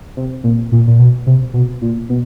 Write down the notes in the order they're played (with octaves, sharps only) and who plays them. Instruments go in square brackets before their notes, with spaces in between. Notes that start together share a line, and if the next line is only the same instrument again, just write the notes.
[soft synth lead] C3
A#2
A#2
A#2
B2
C3
B2
A#2
B2